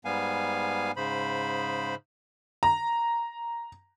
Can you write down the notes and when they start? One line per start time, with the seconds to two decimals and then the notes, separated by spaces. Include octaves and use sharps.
0.05 G#2 G3 B3 F5 G#5
0.96 G#2 C#3 C5 B5
2.63 A#5